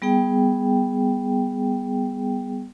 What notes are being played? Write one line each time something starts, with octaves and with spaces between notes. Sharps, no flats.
G3 B3 G#4 G5